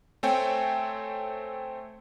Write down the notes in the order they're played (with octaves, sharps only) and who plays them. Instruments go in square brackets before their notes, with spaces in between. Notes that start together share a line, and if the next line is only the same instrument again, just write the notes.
[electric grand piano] A3 C4 C#5 G5 G#5